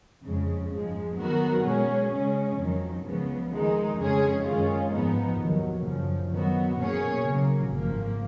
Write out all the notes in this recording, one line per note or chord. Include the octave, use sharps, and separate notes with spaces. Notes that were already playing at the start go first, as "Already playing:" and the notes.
F2 C#3 G#3
G#2 F3 G#3
D#3 F#3 B3 F#4 A#4
B2 G#3 C#4 G#4
C#3 G#3 C#4
F2 D#3 F#3
C#2 C#3 F3 B3
D#3 G#3 D#4
F2 C#3 G#3 C#4 G#4
F#2 D#3 G#3 C#4 F4
G#2 F3 B3 D#4
D#2 D#3 F#3
F#2 C#3 F3
D#3 F#3 B3 F#4
B2 A#3 C#4 G#4 C#5
C#3 F#3 A#3
G#1 G#2 F3 A#3